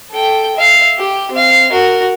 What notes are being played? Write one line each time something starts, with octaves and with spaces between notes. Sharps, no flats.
A4 G5
E5 F5
G4
C4 F5
F#4 A#4